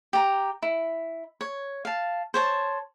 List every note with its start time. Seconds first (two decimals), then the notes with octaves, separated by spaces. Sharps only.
0.13 G4 A#5
0.62 E4
1.41 C#5
1.85 F5 A5
2.34 C5 C#5 A5